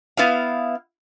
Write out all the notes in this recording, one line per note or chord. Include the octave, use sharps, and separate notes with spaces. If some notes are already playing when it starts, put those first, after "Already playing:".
B3 E4 F5